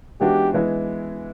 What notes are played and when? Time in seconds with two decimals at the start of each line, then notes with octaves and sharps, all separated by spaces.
0.21 E3 G#3 B3 D4 F#4 G4
0.54 E3 G#3 B3 E4